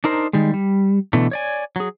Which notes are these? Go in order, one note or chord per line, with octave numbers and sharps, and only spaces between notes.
D4 D#4 A#4 C5
D#3 G3 G#3
G3
B2 D3 E3 A3
C#5 D5 G#5
F#3 G#4